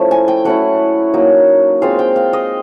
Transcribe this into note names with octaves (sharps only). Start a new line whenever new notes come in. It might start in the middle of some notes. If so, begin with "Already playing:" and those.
Already playing: F3 A3 C#4 E4
G#5
G5
F#3 A3 C#4 E4 F#5
F#3 A#3 D#4
G#3 C4 F4 F5
G5
F5
D#5